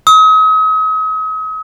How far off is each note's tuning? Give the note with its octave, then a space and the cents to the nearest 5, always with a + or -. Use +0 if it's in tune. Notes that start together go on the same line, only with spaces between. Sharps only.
D#6 +40